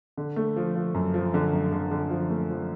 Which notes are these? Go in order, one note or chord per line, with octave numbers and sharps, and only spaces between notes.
D3
A3
F3
F3
F#2
F3
D3
F#2
D3
D3
F3
A3
F3